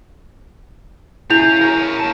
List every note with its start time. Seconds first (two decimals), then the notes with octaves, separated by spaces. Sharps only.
1.30 C#3 E4 G#4 G6 F7
1.61 A#4 C#5
1.99 A#3 A5